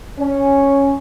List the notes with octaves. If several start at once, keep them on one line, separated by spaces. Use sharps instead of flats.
C#4